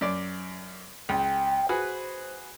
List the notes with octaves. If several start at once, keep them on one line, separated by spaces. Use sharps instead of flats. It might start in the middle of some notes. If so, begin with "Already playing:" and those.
F#2 D5
C#2 G5
F#4 G#4 B4 C5